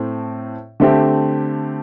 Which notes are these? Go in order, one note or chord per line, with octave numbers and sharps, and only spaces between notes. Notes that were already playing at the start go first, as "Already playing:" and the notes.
Already playing: A2 A3 C4
D3 A3 C4 G4